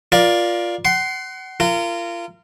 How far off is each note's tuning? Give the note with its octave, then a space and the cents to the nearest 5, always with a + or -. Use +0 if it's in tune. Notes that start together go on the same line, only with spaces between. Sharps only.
F4 +0 A#4 +25 D5 +0
F#5 +30 C6 +0
F4 -30 A#4 -25